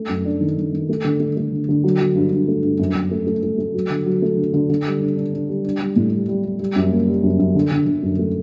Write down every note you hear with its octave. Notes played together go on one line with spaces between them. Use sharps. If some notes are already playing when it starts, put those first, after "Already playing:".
Already playing: A3
F#2
D4
D#3
D#3
D#3
A3
D3
A3
A3
D3
D3
F#3
F#3
G2
G2
A3
G2
F#2
F#2
A3
A3
A3
A3
F#3
D3
F#3
A3
D3
D3
D3
G3
D4
D4
D4
G3
D4
G3
A2
G3
G3
G3
G3
F#2
A#3
G3
F#2
F#2
D3
D3
D3
F#2
A3